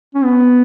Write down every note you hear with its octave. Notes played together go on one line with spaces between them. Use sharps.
C#4
B3